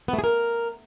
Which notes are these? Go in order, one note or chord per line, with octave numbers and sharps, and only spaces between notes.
B3
A3
G#4
A#4